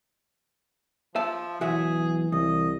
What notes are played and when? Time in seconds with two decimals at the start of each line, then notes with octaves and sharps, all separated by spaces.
1.16 F3 E5 A5
1.61 B1 E3 F#4 G#4 E5
2.32 C2 E3 D#5